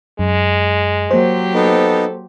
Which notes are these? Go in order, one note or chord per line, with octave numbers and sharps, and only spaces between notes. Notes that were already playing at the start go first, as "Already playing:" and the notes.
F#2 G#3
F#3 A#3 G4 C5
B3 D#4 A4